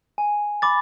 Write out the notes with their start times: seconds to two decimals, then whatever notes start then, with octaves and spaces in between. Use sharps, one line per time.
0.18 G#5
0.62 B5 D6 A6